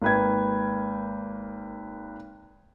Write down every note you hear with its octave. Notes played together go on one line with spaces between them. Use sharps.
G#1 A#3 B4 G5 G#6